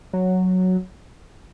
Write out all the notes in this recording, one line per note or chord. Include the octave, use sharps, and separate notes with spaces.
F#3